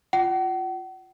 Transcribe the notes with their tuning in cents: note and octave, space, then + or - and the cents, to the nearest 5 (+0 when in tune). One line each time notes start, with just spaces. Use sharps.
F4 +0 F#5 +40